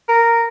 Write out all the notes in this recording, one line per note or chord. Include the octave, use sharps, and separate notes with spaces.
A#4